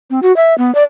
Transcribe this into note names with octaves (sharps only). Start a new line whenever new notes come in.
C4
F#4
E5
B3
D5